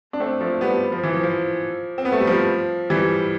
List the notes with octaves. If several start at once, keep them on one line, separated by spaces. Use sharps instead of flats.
D4
A3 C4
F3 A3
G3 B3
F3
E3
F3
F3
C4
B3
A3
G3
F3
E3 G3